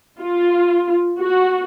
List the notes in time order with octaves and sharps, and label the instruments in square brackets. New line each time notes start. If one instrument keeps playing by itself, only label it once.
[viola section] F4
F#4